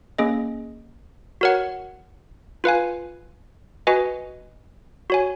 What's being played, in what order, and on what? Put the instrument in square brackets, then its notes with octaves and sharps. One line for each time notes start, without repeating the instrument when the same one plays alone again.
[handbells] A#3 C#4 G#4 D#5
F#4 A#4 C#5 F#5
F4 B4 F5 G#5
F#4 B4 D#5 G#5
F#4 C#5 G#5